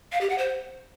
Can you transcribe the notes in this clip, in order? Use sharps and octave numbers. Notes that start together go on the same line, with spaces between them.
F5
G4
F#5
C5